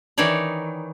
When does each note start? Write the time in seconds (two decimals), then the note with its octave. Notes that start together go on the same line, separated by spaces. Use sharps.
0.18 D#3 E3 D#4 C#5 D5